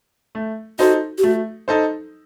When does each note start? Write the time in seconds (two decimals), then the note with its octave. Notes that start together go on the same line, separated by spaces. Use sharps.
0.35 A3
0.79 D#4 F#4 A4 C5
1.18 G4
1.23 A3 F#4
1.68 D#4 A4 C5